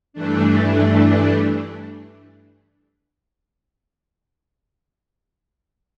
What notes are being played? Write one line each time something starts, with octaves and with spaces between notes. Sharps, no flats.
G2 E3 A3 D4